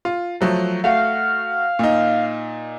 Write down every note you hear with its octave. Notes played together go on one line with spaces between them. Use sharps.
F4
F3 F#3 A3
A3 F#4 F5
A#2 D#4